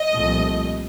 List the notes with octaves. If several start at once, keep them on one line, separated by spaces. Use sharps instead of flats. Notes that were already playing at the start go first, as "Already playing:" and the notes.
Already playing: D#5
C2 A#2 F3 A3